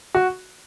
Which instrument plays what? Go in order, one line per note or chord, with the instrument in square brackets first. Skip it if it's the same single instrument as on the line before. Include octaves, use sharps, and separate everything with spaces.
[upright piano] F#4